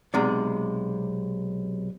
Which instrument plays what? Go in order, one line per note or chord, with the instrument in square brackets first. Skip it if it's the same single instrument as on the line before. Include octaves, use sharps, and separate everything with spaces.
[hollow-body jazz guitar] B1 C3 G#3 D5